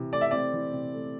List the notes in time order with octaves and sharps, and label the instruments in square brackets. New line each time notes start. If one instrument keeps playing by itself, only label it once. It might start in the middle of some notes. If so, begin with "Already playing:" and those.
Already playing: [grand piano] C3 E3
[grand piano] A3 [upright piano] D5
[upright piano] E5
[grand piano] C4 [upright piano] D5
[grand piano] E3
C3
A3